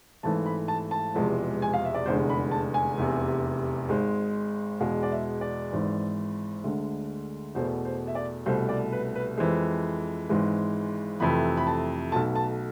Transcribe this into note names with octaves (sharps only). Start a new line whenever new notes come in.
G#1 G#2 E3 A3 A5
B5
A5
A5
E1 E2 C3 F3 G#3
G#5
F5
E5
D5
F1 E2 D3 G#3 C5
B5
A5
G#5
F1 E2 C3
G#1 G#2 G#3
E2 B2 G#3 F5
D5
E5
D5
G#1 G#2 E3
D2 D3 G#3
E2 B2 A3 C5
C5
E5
D5
C2 B2 A3 C5
D5
B4
B4
F2 E3 G#3 C5
G#1 G#2 E3 G#3
F2 C3 E3 A3 B5
B5
A5
B1 B2 A3 A5
A5